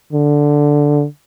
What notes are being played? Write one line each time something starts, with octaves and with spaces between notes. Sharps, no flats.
D3